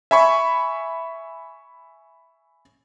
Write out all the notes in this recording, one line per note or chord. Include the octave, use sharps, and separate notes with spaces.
E5 G#5 B5 C#6